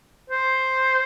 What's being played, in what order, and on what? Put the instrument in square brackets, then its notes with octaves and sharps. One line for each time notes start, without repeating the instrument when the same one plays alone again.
[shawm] C5